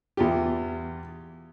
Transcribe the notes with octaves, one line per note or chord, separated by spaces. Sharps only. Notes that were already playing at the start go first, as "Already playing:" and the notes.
E2 F4 G4